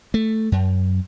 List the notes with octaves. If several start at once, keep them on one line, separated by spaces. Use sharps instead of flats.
A3
F#2